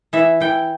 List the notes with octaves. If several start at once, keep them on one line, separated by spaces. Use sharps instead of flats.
E3 E5
E3 G5